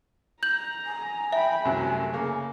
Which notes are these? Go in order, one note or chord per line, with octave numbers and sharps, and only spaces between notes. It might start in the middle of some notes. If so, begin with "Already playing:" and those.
A#5 G6 F#7
G#5
E5 G5 B5
C2 F#2 C3 A3
C#3 A#3